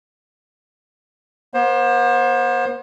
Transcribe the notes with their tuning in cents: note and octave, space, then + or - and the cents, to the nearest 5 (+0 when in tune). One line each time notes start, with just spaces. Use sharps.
B3 -40 C5 +25